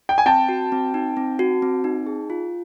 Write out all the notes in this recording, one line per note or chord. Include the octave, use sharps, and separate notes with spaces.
G5
G#5
C4 G5 A5
F#4
C4
D#4
C4
F#4
C4
D#4
G#4
F4